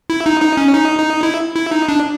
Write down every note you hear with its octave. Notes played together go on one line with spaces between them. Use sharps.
E4
D#4
D#4
C#4
D#4
D#4
E4
E4
D#4
D4